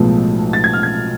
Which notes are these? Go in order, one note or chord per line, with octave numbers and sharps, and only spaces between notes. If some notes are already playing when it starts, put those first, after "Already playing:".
Already playing: B1 A2 F3 G#3 B3
A6
G#6
F6
G#6